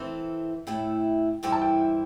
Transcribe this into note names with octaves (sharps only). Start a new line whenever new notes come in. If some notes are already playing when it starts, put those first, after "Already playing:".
Already playing: E3 C4 A4 E5
A2 A3 E4 G5
G2 E3 C4 E4 A4 G5
A5
G5
G5